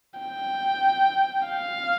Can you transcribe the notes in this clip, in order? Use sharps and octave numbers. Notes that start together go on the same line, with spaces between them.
G5
F5